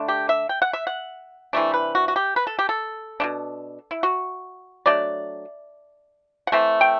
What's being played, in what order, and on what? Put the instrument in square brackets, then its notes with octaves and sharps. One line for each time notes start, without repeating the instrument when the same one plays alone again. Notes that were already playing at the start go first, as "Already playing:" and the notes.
Already playing: [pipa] D3 A3 D4
G4
E5
G5
F#5
E5
F#5
C3 E3 A3 D4
B4
F#4
F#4
G4
B4
A4
G4
A4
B2 A3 D4
E4
F#4
F#3 A3 D4 D5
F#5
E3 A3 C4 E5
G5